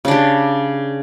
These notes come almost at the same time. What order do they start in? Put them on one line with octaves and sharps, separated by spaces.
C#3 D4 G4